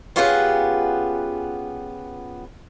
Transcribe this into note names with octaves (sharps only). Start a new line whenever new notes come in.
B3 C#4 F4 G4 G#4 F#5